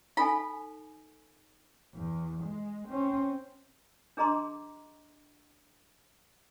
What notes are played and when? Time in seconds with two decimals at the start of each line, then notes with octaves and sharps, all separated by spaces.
0.17 D#4 A4 G#5 B5
1.95 E2
2.44 G#3
2.88 C4 C#4
4.17 D4 G#4 D#5 A#5 C6 D6